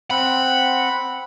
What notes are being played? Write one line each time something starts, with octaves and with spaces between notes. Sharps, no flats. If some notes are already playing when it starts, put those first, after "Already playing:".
C4 F#5 B5